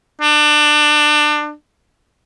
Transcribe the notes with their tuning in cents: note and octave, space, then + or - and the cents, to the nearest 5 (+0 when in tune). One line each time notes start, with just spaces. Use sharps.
D4 +25